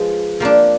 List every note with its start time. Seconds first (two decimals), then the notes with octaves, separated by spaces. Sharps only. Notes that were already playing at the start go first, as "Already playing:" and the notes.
Already playing: F3 G#3 G#4 B4
0.40 F3 A#3 D4